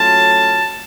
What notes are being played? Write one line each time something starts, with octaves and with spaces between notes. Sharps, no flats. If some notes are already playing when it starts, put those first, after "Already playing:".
Already playing: F#3 A3 C#4 F4 A5